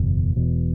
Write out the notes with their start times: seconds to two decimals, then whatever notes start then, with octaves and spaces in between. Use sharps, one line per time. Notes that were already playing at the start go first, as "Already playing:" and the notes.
Already playing: F#1 E2 B2
0.36 E1 E2 B2